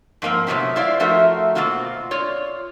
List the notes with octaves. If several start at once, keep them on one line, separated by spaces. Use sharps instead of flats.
G#2 F3 A#3 C4
A2 C3 D#3 F#3 B3 C4
E4 F4 C5 D5
F3 A3 F4 F#4 A#4 E5
B2 A#3 C4 F4 F#4
F4 C#5 D5